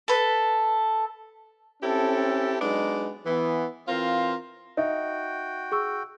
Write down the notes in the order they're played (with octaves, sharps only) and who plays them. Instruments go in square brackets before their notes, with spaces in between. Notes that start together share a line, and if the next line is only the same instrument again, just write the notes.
[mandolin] A4 B4
[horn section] C4 C#4 E4 G4 A4
F#3 G#3 B3 D4 D#4
E3 B3
E3 C4 F4 A#4 C5 F5
[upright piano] D#4 [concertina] F#4 G5 [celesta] E5
[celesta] G#4 C#6 E6